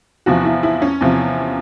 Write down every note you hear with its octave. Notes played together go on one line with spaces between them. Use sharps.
E2 C3 F3 F#4
E4
E4
C#4
E2 C3 F3